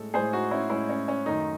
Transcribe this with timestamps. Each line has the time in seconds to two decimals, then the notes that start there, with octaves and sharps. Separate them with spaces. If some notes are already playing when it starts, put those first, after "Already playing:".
Already playing: A2 G#3 A4
0.14 A2 G#3 G#4 C5
0.33 D#4 F#4
0.51 C#4 E4
0.70 A2 G#3 C#4 E4
0.89 C#4
1.08 C#4
1.26 F#2 D#3 A3 D#4